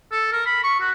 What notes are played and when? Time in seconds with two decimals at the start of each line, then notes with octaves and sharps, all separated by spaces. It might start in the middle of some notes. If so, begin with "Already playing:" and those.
0.11 A4
0.32 A#4
0.46 B5
0.64 C#6
0.80 F#4